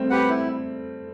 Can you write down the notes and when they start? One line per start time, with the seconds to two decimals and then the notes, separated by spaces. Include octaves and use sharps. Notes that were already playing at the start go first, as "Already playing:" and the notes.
Already playing: G3 A3 C4
0.10 G4 B4 F#5
0.29 E4